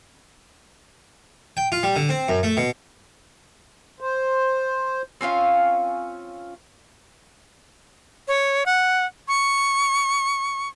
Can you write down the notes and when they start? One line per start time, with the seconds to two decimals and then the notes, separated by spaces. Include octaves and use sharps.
1.57 G5
1.72 F4
1.83 G3
1.96 D3
2.09 C4
2.28 F#2
2.43 A3
2.57 B2
4.01 C5
5.21 C4 C#4 F4 F5
8.28 C#5
8.66 F#5
9.28 C#6